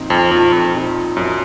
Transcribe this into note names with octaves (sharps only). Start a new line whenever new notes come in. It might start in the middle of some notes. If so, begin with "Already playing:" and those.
Already playing: A#2 F3 C4 D#4
F2
F2 A#2 F3 C4 D#4
F2
A#2 F3 C4 D#4
F#2 A#2 F3 C4 D#4